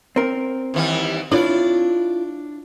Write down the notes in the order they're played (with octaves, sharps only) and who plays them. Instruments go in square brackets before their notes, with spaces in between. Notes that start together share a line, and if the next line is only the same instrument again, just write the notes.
[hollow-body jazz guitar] C4 A#4
[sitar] D#2 E3 G3
[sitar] D4 D5 [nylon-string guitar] E4 F4 C#5